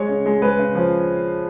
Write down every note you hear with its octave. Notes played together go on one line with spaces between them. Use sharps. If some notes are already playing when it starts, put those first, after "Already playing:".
Already playing: G#3 C#5
C#3
G#3
G#3 B4
C#3
F3